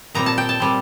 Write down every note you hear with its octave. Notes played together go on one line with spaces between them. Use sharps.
A#2 G3 C4 A#5
A5
G5
A5
A#2 G3 C4